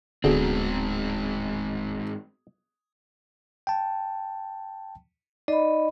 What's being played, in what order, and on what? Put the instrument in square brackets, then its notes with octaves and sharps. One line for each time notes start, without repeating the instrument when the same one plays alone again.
[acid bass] D1 [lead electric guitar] G#2 C4 [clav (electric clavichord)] D3 [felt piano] B3 F#4 G#4
[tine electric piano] G5 A5
[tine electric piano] D#4 D5 [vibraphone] D#5 B5